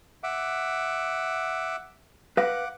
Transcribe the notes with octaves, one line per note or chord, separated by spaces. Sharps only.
E5 F#5 D6
B4 F5 F#5 D6